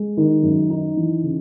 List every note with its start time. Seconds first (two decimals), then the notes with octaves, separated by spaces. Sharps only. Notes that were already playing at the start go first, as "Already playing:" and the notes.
Already playing: G#3
0.17 D#3
0.43 F#2
0.70 D#4
0.97 E3
1.24 C#3